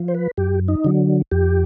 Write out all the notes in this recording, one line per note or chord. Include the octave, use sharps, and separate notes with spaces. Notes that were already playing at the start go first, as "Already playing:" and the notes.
Already playing: F3
C5
B4
F#2 G4
D#4
D3 F#3
F2 G4